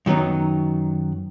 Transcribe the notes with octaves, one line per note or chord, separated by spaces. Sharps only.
F#2 D#3 F#3 B3 D#4